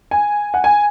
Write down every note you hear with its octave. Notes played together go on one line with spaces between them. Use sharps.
G#5
F#5
G#5